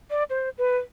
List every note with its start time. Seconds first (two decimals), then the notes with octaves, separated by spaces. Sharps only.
0.10 D5
0.30 C5
0.58 B4